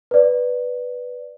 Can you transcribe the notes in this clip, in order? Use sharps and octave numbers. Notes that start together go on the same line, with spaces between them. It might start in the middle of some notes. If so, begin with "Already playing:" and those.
B4 D5